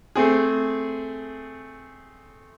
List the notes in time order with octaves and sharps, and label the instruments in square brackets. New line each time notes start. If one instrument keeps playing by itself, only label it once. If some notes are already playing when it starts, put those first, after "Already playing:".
[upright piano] A3 C4 G#4